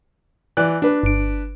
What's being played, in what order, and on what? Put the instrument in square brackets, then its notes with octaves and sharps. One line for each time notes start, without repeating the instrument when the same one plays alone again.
[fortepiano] E3 D5 F#6
D4 B4
[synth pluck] G1 D7